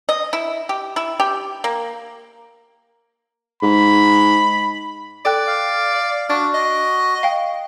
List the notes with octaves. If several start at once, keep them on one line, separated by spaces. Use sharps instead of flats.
D#5
E4
G4
E4
G4
A#3
G#2 B5
A4 D5 G5 F#6
F5
D4 F#4 A6
D#5
F5 G5